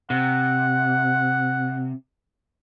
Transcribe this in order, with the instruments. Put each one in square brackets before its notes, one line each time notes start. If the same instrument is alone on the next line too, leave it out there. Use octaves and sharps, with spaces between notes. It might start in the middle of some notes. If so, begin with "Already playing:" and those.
[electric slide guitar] C3 [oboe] F#5